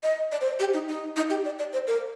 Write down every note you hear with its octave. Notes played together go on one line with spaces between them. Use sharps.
D#5
D5
C5
G4
D#4
D#4
D#4
G4
D5
D5
C5
A#4